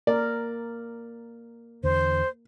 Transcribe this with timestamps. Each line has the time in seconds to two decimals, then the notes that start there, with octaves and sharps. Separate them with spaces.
0.07 A#3 A#4 D5
1.84 E2 D3 C5